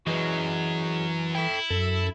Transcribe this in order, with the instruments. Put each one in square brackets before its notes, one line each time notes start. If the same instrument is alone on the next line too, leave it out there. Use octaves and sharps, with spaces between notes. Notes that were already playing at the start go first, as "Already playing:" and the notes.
[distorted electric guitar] F#2 F#3 [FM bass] E3 [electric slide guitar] F#4 G#4 D#5
[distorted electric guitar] E4 [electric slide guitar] A4 G5
[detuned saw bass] F#2 [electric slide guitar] A4